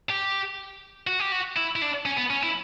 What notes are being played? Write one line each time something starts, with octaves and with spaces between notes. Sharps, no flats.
G4
F#4
G4
F#4
E4
E4
D4
C#4
B3
C#4
E4